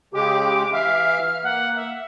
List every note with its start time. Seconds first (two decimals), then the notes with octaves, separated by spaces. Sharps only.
0.14 C#3 G#3 G4 D6
0.73 E3 E5 F5 F6
1.44 A#3 F#5
1.76 E5